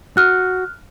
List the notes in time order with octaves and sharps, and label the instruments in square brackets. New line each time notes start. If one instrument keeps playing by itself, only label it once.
[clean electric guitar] F#4 [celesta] F6 F#6